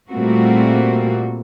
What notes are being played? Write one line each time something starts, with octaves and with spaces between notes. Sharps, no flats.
A#2 G3 A3 A#3 C4 F#4